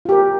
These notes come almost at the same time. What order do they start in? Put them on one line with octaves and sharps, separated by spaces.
F4 G4 A#4